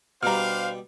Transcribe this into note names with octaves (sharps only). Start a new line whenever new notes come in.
B2 G3 D4 C5 F5 A#5 F6